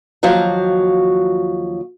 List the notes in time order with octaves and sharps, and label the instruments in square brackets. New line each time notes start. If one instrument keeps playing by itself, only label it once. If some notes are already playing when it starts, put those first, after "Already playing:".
[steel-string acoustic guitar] D#2 F3 F#3 F#4 F5